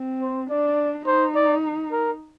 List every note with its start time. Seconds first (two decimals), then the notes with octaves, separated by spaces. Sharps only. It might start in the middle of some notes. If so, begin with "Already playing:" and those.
Already playing: C4
0.22 C5
0.50 D4 D5
1.07 D#4 C5
1.35 D5
1.91 A#4